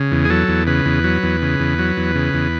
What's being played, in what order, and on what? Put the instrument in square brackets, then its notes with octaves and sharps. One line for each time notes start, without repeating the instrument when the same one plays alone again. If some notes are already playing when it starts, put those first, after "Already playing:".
Already playing: [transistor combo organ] C#3
E2
G#4
F#3 A4
E2
C#3 B4
E2
F#3
E2
C#3
E2
F#3
E2
C#3
E2